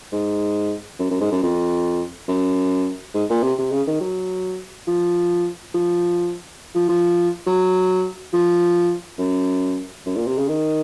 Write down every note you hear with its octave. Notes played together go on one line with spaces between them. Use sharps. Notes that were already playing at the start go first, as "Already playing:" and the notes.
G#2
F#2
F#2
G#2
F#2
F2
F#2
G#2
A#2
C3
C3
C#3
D#3
F#3
F3
F3
F3
F3
F#3
F3
F#2
F#2
A#2
C3
C#3
D#3